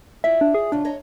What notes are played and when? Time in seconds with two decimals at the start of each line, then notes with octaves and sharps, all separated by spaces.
0.24 E4 F4 D5 E5
0.41 D4
0.54 G#4
0.72 C#3 D4 F4
0.85 C#5 D#5 A#5